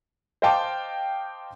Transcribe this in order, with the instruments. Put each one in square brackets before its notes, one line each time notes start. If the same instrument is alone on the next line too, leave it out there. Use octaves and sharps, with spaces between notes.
[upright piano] C5 D#5 F5 G5 A5 D6